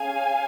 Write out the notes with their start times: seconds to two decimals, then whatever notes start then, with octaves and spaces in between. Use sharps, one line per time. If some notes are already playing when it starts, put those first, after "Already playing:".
Already playing: C#4 G#4 F5 G#5